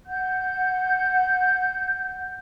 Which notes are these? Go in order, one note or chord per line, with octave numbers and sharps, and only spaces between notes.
F#5 G6